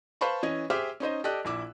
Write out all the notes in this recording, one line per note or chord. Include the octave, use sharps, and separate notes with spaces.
B4 C5 F5 A5 B5 C#6
E3 C#4 D#5 G#6
G4 G#4 C5 E5 D6 F6
C#4 D#4 C5 D#5
G4 A4 D5 D#5 F#6
A#1 E4 D6 E6